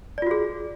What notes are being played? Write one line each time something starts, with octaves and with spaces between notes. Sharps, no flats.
F4 F#4 G#4 D5